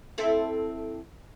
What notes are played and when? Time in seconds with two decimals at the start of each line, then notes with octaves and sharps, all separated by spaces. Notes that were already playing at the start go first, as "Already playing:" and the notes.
0.18 C4 E4 A4